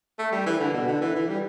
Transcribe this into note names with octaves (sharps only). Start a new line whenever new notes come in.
A3
G3
E3
D3
B2
D3
E3
E3
G3